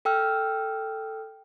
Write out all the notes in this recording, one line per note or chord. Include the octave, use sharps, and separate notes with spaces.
A4 G5 E6 F6